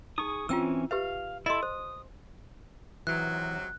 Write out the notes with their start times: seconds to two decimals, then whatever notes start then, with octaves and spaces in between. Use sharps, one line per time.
0.18 D#4 G#4 C#6 D#6
0.49 E3 C4 C#4 F4 G5 E6
0.91 G4 B4 E5 F5
1.46 E4 A4 D#5 C6
1.63 C5 D#6
3.07 G#2 C3 E3 F#3 F#6